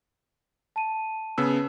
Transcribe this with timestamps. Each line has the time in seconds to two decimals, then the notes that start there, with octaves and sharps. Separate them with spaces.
0.76 A5 D#7
1.38 C#3 B3 E6